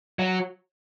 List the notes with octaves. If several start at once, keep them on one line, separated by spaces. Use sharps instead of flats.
F#3